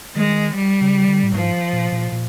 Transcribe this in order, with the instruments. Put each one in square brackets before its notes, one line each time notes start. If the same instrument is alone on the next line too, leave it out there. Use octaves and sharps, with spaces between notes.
[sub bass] D#3 [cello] G#3
[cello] G3
[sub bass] C#3
D3
A2
[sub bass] G#2 [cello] F3
[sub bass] A#2
A#2
A#2